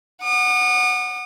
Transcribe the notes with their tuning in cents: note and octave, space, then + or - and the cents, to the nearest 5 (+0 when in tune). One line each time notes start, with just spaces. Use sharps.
F#5 +0 D#6 -45